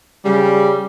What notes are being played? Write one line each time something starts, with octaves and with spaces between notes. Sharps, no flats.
C#3 G3